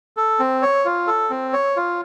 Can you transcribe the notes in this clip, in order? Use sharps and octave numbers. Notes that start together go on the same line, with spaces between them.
A4
C4
C#5
F4
A4
C4
C#5
F4